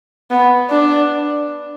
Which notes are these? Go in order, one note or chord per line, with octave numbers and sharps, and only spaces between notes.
B3
D4